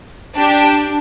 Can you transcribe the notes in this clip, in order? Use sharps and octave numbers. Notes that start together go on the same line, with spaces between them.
D4 G4